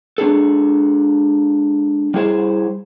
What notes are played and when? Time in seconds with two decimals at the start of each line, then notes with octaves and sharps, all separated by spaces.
0.18 G#3 D4 G#4 A4
2.14 G3 E4 G#4 C5